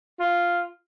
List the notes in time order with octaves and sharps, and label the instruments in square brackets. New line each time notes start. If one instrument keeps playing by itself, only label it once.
[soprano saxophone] F4